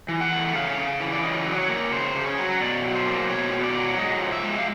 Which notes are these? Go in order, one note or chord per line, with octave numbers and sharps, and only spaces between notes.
E3
F#5
A3
C#3 F5
C#3
E3
D5
C#3 D#5
F#3
D5
C#5
A#3
C#3 C5
C#3
C#5
F#3
B2 D5
F#3
C5
A#3
B2 C#5
B2
D5
F#3
G#2 D#5
F3
E5
G#3
F5